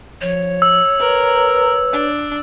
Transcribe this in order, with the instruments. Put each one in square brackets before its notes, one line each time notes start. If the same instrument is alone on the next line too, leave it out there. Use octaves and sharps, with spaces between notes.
[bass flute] F3 [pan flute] C#5
[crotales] E6
[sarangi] A#4 [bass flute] B4
[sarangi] D4